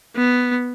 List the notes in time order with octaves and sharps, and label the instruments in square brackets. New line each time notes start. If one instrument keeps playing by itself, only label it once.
[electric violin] B3